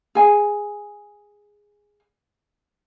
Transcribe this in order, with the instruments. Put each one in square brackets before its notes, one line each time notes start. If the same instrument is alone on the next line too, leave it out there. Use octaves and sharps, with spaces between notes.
[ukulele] G#4 G#5